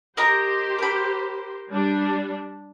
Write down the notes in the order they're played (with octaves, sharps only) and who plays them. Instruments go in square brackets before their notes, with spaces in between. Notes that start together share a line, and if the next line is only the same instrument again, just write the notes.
[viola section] G4 C5 [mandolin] A#4 D#5 A#5
[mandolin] A#4 B5
[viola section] G3 D4